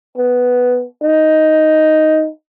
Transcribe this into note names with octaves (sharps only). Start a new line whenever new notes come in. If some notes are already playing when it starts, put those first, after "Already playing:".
B3
D#4